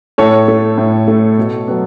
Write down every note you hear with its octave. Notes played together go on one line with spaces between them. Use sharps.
A2 A4 C#5
A3
A2
A3
B2
F#3 B3